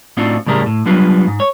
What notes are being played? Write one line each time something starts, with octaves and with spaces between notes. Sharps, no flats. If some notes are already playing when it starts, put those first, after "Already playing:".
A2 C4 D4 D#4 F4 F#4
A2 C#3 G3 G#3 A#4
A2
F#3 G3 B3 D4 F4
G#2
C#5